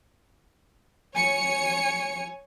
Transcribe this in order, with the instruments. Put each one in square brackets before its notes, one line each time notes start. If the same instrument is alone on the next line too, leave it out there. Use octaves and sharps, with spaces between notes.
[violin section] C#5 C#7 [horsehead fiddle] G#5